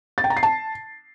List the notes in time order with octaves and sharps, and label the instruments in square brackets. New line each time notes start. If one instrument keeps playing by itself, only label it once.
[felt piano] A6
G5
A#5
C7
A5